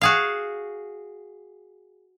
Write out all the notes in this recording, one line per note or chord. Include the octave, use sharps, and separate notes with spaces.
F#4 G#4 F5